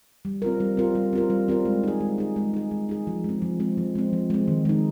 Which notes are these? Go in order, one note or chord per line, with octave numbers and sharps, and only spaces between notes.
G3
C4 F4 A#4
G3
C4 F4 A#4
G3
C4 F4 A#4
G3
C4 F4 A#4
G#3
D#4 G#4
G#3
D#4 G#4
G#3
D#4 G#4
G#3
D#4 G#4
F3
G#3 C4
F3
G#3 C4
F3
G#3 C4
F3
G#3 C4
D#3
G#3 D#4